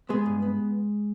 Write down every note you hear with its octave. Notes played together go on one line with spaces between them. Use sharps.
G#3 B3 G#4
G2
B3